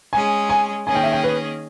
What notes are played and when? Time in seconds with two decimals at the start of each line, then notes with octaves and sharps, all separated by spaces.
0.13 G#3 C#4 G#4 G#5
0.49 G#5
0.87 D#3 A#3 C#4 G#4 D#5 G#5
0.95 G5
1.03 E5
1.13 G5
1.24 B4